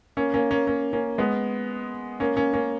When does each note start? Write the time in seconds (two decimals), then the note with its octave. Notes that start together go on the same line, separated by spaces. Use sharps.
0.17 A#3 C#4
0.34 A#3 C#4
0.51 A#3 C#4
0.67 A#3 C#4
0.93 A#3 C#4
1.18 G#3 B3
2.20 A#3 C#4
2.37 A#3 C#4
2.53 A#3 C#4